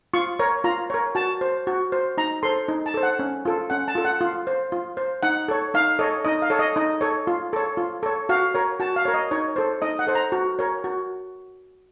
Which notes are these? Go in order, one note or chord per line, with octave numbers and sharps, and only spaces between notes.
F4 C#6
A#4 C#5
F4 A#5
A#4 C#5
F#4 A5
C5
F#4
C5
D#4 A#5
A4 C5 C6
D#4
A5
A4 C5
F#5
C#4
F4 A4
C#4 F#5
A5
F4 A4
F#5
F4
C5
F4
C5
D#4 F#5
A4 C#5
D#4 F5
A4 C#5 D#5
D#4 D#5
F5
A4 C#5
D#5
D#4 D#5
A4 C#5
F4
A4 C#5
F4
A4 C#5
F#4 F5
A#4 C#5
F#4 A5
F5
A#4 C#5
D#5
D#4 C#5
A4 C5
D#4 D#5
F#5
A4 C5
A#5
F#4
A#4 C#5
F#4